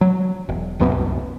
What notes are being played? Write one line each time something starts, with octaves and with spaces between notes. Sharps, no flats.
F#3
E1
D1 C2 F#2 B3